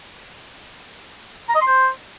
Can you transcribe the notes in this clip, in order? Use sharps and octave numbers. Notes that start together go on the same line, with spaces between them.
A#5
D#5
C6
C5